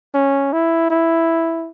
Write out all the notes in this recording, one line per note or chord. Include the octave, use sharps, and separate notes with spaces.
C#4
E4
E4